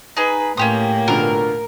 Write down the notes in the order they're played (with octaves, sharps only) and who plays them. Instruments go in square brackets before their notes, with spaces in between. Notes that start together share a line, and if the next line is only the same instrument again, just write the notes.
[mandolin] D#4 G#4 [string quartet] B4
[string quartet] A2 A#3 [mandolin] C#4 G4 D#6 [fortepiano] C6
[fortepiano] B2 D3 F3 [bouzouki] A#4